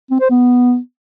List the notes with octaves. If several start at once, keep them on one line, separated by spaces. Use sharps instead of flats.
C4
C5
B3